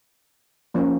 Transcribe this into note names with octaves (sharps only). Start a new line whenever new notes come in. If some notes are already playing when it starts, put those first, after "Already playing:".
F3 A#3 C#4